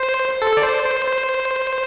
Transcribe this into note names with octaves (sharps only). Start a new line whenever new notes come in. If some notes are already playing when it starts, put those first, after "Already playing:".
Already playing: C5
A4
D5
C5
C5
C5